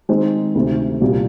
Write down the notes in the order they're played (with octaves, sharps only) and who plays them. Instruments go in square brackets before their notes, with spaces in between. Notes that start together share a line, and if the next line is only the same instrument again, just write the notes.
[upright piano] D#3 G#3 C4
D2 C3 D#3
C2 A#2 G3